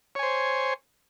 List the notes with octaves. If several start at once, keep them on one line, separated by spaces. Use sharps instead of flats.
C5 C#5 G#5